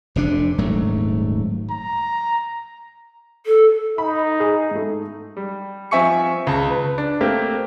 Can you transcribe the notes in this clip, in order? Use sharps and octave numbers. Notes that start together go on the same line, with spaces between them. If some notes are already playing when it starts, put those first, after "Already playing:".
F1 C3 D4
D#1 G#2 F#3 A3
A#5
A4
D#4 B5
G#4 D#6
G#2 A3
G3
F3 C4 E5 G#5 C#6 C#7
C#2 A5 A#5
B4
D4
A3 A#3 C4 G4